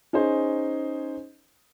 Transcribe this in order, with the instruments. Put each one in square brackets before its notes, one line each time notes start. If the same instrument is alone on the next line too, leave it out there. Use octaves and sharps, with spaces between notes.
[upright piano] C#4 D#4 G#4 C5